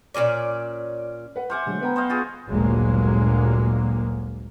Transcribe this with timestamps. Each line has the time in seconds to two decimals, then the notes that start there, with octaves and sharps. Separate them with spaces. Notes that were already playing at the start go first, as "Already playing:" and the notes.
0.14 A#2 G#3 C#4 D5
1.36 B4 F#5
1.50 C5 E5 F#5 G#5 D6 F6
1.66 D3 F#3 G#3 A3
1.81 B3 B4 G5 A#5
1.96 C5 D#5 F5
2.09 F4 F#4 G#4
2.48 G1 D2 A#2 F#3 G#3 A#3